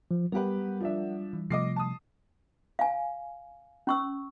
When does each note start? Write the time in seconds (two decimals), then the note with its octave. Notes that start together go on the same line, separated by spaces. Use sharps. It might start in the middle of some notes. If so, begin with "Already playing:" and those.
0.11 F3
0.32 G3 B3 G4 A#4 B4 F#5
0.80 F3 D4 E5
1.33 E3
1.50 C3 F3 A3 D#5 D6 C7
1.76 A5 D#6
2.79 F5 G#5
3.87 C#4 C#6 E6